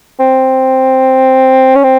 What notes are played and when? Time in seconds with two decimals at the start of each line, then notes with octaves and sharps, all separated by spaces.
0.20 C4
1.75 C#4
1.84 C4